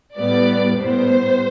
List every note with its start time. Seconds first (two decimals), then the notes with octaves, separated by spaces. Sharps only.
0.17 A2 G3 B3 D5
0.79 A2 G3 B3 C5